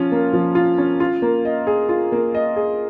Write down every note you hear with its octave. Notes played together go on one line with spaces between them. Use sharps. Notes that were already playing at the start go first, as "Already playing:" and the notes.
Already playing: F3 C#4 F4
A#3
F3
F4
C#4
F4
A#3
D#5
G#4
F4
A#3
D#5
G#4